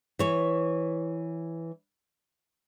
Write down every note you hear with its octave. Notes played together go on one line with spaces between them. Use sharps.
E3 C#5